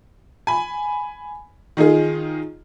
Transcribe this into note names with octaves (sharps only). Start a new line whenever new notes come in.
G#5 B5
D#3 D#4 F4 G#4